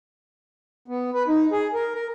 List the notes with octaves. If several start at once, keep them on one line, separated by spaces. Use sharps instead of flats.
B3
B4
D#4
G#4
A#4
A#4